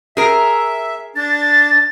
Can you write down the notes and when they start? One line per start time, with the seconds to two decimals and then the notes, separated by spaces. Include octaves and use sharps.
0.17 G#4 A#4 E5
1.16 D4 A6